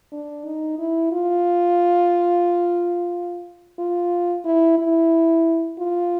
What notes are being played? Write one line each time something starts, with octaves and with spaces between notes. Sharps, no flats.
D4
D#4
E4
F4
F4
E4
E4
F4